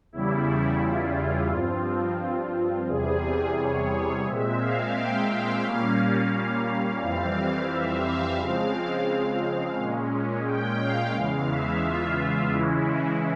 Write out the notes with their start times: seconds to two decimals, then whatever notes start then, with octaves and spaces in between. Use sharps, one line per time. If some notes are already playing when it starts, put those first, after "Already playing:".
0.12 E2 C#3 G3 E4
0.81 F4
1.50 G2 F3 C4
2.88 E2 C3 G3 G#4
3.57 C#5
4.26 A#2 G#3 C4 E5
4.60 F5
4.95 G5
5.29 F5
5.64 A#2 G3 A#3 C#4
7.01 F2 E3 G3 C4 F5
7.70 E5
8.05 F5
8.39 C#3 F3 G#3 C4 F5
9.77 A#2 G#3 C#4
10.46 G5
10.80 F5
11.15 E2 C#3 E3 G#3 F5
11.49 E5
11.84 F4
12.52 C#3 E3 G#3 C#4 E4